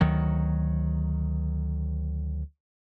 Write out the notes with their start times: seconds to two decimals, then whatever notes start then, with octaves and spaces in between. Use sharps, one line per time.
0.01 D2 D#3 F#3